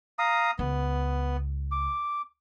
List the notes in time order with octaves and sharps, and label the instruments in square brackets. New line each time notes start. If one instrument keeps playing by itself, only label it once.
[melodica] F5 A#5 D#6
[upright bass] C#2 [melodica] B3
[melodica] D6